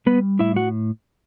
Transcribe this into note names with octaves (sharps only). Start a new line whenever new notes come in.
G3 B3 B4
A2 E4 E5
F#4 F#5